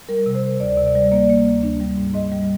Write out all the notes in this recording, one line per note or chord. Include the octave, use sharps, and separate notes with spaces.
G3 A#4
C3
C5
C3
D2 D5
C3
D5
G3
A#3 D5
A#3
D2
D4
G3
G#2
G#2 D#5
G3